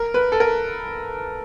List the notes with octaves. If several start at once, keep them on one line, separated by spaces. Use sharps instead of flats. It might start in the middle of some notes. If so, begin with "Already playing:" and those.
Already playing: A#4
B4
A4
A#4